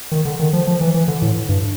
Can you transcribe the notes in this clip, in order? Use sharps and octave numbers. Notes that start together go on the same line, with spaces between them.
D#3
D3
D#3
F3
F3
E3
E3
D3
A2
G2